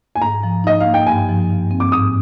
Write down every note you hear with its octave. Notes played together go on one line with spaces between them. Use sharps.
G#5
G#2 A#5
F3
D#4 D#5
F5
A#3
G5
G2 G#5
F3
G2
C4
D6
G#2 D#6